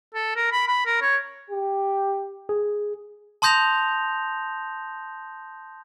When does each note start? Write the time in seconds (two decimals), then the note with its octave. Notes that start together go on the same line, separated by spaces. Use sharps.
0.14 A4
0.36 A#4
0.52 B5
0.68 B5
0.86 A#4
1.02 C#5
1.50 G4
2.49 G#4
3.42 A5 C6 D#6 G6 A#6 F7